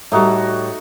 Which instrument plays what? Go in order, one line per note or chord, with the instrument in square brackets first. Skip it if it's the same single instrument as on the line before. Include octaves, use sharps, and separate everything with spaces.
[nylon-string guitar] A2 G3 [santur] A3 D#4 F#4